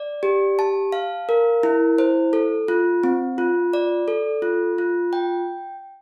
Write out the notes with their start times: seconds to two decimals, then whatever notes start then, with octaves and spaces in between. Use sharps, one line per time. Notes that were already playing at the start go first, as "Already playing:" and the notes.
Already playing: D5
0.23 G4
0.59 A5
0.92 F5
1.29 A#4
1.63 E4
1.98 C5
2.33 A4
2.68 F4
3.04 C4
3.38 F4
3.73 D5
4.08 A4
4.42 F4
4.78 F4
5.13 G5